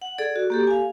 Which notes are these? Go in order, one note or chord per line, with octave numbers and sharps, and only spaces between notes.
F#5
G#4 A4 D5
F#4
A#3 G4 A4
F5 G#5